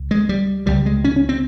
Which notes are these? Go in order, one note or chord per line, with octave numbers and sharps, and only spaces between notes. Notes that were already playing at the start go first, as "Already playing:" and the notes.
Already playing: C#2
G#3
G3
C#2 C3 G3
G#3
C#4
C#4
C4